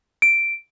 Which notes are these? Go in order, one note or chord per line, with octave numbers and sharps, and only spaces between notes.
D7